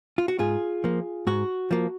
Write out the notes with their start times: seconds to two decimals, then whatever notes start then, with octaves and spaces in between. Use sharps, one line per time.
0.18 F4
0.28 F#4
0.39 G#2 F4 G#4
0.84 F3 A#3
1.27 G#2 F#4
1.71 F3 A#3